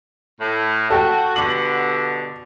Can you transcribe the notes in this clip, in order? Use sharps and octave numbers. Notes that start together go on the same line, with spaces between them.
A2
F#4 A4 G5
G2 B2 D3 F#7